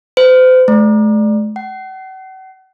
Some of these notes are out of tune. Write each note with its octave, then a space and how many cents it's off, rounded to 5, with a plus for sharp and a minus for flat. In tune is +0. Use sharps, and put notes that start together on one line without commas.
C5 -40
A3 -45
F#5 +40